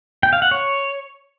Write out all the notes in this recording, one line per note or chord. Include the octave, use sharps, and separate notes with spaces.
G5
F5
F#5
C#5